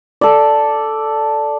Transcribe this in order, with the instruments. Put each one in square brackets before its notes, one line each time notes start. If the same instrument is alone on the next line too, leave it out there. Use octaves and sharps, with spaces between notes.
[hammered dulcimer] A4 D5